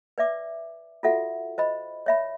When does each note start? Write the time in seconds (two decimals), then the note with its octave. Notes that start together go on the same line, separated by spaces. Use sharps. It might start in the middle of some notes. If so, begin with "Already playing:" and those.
0.18 B4 D5 E5 D6
1.03 F4 F#4 A4 E5 F#5
1.58 C5 D#5 B5
2.06 C#5 E5 B5